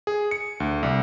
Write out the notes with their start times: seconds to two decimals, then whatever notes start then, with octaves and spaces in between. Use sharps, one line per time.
0.07 G#4
0.31 C#7
0.60 D2
0.83 C2